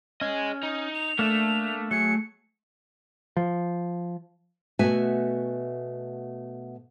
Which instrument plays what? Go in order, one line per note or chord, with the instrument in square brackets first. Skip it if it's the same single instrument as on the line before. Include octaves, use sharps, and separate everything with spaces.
[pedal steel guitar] C#4 [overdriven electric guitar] G#4 D#5
[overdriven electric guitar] D#4
[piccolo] F7
[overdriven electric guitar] A3 [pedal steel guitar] A#3 D4 E5
[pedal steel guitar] F#3 G#4 [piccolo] C#7
[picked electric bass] F3
[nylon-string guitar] B2 A3 F#4 E5 G#5